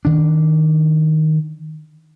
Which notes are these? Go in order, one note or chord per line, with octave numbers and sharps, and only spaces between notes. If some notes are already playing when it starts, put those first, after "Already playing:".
D#3 D4